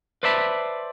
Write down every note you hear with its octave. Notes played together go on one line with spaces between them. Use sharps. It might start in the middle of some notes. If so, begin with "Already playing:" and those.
B4 C5 D5 E5 A5 B5